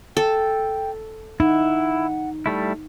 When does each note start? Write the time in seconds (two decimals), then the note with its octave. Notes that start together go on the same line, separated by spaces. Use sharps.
0.17 A4 G5
1.40 D#4 E4 F#5
2.46 G3 A3 E4